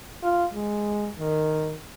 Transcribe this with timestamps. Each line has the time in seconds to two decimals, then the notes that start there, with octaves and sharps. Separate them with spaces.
0.23 F4
0.53 G#3
1.20 D#3